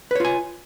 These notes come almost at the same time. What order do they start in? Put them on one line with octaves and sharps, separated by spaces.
B4 C#5 F4 G#5